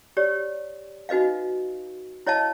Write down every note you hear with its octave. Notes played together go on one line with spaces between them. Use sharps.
G4 C#5 D5
D#4 F#4 B4 D#5 F5
E4 C#5 D#5 F5 A5